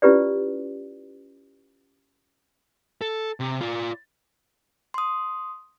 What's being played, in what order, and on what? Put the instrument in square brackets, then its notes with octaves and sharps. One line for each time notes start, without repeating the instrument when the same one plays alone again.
[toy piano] C#4 E4 F4 G4 B4 D5
[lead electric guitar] A4
C3
F4 D5
[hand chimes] C6 D#6